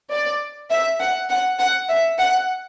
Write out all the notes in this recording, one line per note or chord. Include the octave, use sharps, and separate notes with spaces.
D5
E5
F#5
F#5
F#5
E5
F#5